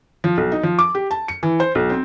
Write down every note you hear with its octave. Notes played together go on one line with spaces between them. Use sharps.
F3
B1
D#4
F3
D6
G4
A5
C#7
E3
C5
B1
C4